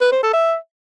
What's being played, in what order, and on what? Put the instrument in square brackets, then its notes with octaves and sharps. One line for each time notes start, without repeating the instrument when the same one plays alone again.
[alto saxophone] B4
C5
A4
E5